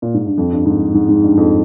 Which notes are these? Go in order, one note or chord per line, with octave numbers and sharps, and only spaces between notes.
A#2
G#2
G2
F2
G2
G#2
G#2
G#2
G2
F2